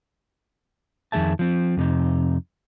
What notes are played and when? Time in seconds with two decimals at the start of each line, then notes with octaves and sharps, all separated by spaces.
1.12 F2 D#3 G#3 G#4 E5 A5
1.39 F3 C4
1.77 F2 C3 D#4